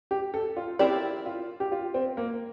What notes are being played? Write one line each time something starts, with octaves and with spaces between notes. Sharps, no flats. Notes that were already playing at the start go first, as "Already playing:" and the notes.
G4
A4
F4
C4 E4 G4 A#4 D5
F4
G4
F4
C4
A#3